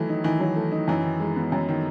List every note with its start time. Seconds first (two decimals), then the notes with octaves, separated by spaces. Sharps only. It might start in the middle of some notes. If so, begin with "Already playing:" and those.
Already playing: D#3 E3 F#3 A3
0.09 D#4
0.24 D#3 E3
0.40 F#3
0.56 A3
0.72 D#4
0.88 F#2 E3
1.04 D#3
1.20 G#3
1.36 B3
1.52 F#2
1.69 D#3